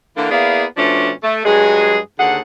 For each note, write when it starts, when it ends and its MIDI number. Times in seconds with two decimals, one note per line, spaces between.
0.16 0.29 50
0.16 0.29 52
0.16 0.29 58
0.31 0.64 58
0.31 0.64 59
0.31 0.64 64
0.31 0.64 68
0.31 0.64 74
0.31 0.64 77
0.77 1.10 47
0.77 1.10 53
0.77 1.10 57
0.77 1.10 61
0.77 1.10 62
1.23 1.43 57
1.45 1.98 43
1.45 1.98 54
1.45 1.98 56
1.45 1.98 68
2.19 2.38 39
2.19 2.38 50
2.19 2.38 68
2.19 2.38 69
2.19 2.38 78